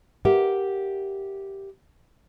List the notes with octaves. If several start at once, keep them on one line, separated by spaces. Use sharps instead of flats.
G4 A#4 E5 F#5